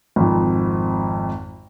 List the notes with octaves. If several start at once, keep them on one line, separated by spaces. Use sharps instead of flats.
G#1 F2